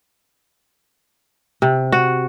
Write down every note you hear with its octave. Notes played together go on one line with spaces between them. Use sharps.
C3
F#4